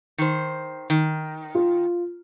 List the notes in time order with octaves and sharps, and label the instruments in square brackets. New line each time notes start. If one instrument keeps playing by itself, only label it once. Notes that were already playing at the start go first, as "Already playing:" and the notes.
[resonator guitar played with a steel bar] D#3 C5
D#3
[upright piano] F4